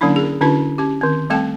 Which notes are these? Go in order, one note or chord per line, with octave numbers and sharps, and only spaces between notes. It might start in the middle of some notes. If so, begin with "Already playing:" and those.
D3 F#3 A#3 C#4 D4 E4
G#4 A#4
D3 C#4 D4 E4 F#4 B4
C#4 G4
D#3 C4
G3 A3 C4 A4 G5 A5